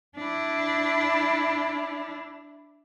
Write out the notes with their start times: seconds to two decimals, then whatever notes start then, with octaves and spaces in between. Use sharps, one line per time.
0.17 D4 E4